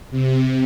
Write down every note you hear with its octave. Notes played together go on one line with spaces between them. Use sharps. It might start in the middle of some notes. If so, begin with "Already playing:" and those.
C3